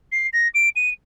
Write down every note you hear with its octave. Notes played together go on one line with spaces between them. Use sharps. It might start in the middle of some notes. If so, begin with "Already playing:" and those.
C7
A#6
D7
D#7